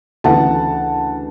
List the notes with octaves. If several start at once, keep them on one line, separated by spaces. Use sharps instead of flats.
D2 C#3 E3 F#5 A5